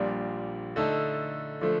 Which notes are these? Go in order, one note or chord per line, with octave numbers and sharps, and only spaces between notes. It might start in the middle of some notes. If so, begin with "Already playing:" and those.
Already playing: A#1 A#2 G3 D4 F4
D3 A3 D#4 A4
D3 F3 A3